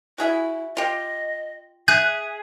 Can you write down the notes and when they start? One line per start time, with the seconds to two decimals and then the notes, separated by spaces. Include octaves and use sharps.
0.18 E4 F#4 G#4 E5
0.77 F4 G4 D#5
1.88 G#4 E5 F#6